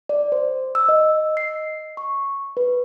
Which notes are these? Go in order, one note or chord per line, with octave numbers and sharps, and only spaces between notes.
D5
C5
E6
D#5
C7
C#6
B4